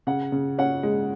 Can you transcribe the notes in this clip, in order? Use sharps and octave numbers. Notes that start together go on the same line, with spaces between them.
C#3 F#5
C#3
C#4 F#5
G#3